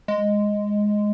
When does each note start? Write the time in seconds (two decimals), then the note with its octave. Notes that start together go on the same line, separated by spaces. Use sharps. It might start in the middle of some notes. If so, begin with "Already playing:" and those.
0.08 G#3